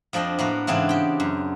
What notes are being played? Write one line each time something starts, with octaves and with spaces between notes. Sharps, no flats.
F2 F3 D4 D#5 G5
A2 A#3 B3 F#4
G#2 C#3 E3 B3 C4 D4
G4 G5
F#2